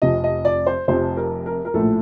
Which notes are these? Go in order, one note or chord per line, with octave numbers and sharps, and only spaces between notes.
F1 F2 C3 D#5
D#5
D5
C5
F1 F2 C3 C5
A#4
A#4
A#4
A#1 A2 F3 A3 A4